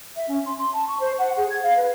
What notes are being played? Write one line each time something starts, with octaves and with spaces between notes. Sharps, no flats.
E5
C#4
C6
C6
A5
C#6
C5
F#5
G#4
G#6
F5
B4